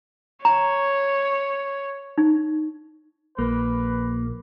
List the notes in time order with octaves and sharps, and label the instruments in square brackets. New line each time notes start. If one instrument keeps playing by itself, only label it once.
[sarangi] C#5 [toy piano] A#5
[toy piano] D#4
[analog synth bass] A#1 [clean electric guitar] A#3 [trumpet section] B4